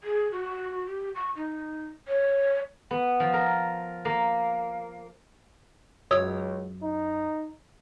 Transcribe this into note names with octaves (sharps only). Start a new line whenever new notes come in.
G#4
F#4
G4
C#6
D#4
C#5
B3
F3
A#4
A#3
C#2 F#2 C#5 D#6 E6
D#4